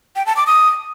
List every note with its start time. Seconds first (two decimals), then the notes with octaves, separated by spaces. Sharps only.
0.16 G5
0.26 A5
0.37 D6
0.47 D#6